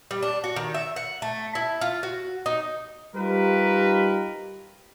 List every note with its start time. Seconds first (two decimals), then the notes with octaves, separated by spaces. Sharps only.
0.11 G3
0.23 D4
0.44 F#4
0.56 D#3
0.74 E5
0.96 F#5
1.22 A3
1.55 E4
1.81 F4
2.03 F#4
2.46 D#4
3.15 G3 D#4 F4 G4 A#4 B4